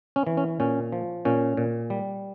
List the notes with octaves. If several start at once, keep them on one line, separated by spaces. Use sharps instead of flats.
C#4
E3
C#4
A#2 C#4
F3
A#2 C#4
A#2
G3